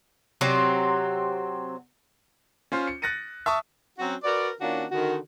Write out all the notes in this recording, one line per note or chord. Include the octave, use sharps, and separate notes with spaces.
C3 F#3 C4
C#4 F4 C5
C#7
F#6 A6 A#6 C#7 D#7
E5 A5 C#6 D#6
F#3 C4 C#4 F#4
F#4 A#4 B4 D5
D#3 A#3 C#4 D4 F4 F#4
D3 D#3 F#4